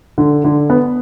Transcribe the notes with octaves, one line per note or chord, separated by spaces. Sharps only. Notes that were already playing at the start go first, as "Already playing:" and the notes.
D3
D3
B3